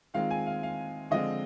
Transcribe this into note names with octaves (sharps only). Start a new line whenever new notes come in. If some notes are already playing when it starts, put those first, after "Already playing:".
D#3 G#3 C4 F4 F5
G#5
F5
F5
D3 F3 G#3 C4 F4 D#5